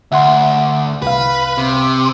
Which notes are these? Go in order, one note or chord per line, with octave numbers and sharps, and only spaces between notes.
D2 E5 F#5 C6
C2 B4 F5
C3